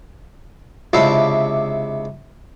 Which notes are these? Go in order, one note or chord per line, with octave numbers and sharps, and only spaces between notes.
C#2 C3 D4 E4 F5